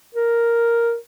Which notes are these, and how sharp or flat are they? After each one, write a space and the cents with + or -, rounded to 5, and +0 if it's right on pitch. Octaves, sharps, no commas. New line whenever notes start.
A#4 +0